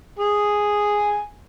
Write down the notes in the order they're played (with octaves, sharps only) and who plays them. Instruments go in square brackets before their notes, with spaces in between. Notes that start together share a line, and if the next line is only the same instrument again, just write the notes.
[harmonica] G#4 G#5